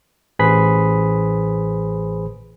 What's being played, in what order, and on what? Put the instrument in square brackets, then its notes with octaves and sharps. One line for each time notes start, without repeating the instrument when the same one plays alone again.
[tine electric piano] A1 G#4 B4 C5 B5 B6